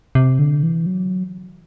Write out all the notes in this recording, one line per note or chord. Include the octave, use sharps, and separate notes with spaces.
C3
D3
E3
F#3